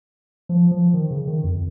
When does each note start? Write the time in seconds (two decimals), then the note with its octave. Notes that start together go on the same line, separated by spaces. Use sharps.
0.49 F3
0.71 F3
0.94 D#3
1.11 C#3
1.27 D#3
1.44 F2